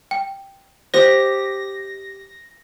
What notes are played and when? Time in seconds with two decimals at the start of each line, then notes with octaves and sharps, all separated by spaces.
0.11 G5
0.94 G4 C5 D#5 A#6